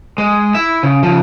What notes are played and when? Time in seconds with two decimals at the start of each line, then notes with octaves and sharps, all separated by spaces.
0.18 G#3
0.55 E4 E5
0.83 C#3
1.03 C#3 F3